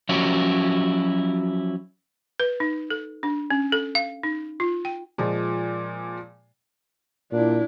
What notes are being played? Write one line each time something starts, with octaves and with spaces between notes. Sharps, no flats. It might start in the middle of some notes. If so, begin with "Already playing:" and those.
F3 F#3 C#4 E4 F#4 G4
B4
D#4
A4
D4
C#4
A4
F5
D#4
F4
G5
A#2 F3 G#3
A#2 D4 E4